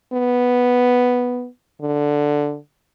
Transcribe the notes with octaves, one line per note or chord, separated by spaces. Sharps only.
B3
D3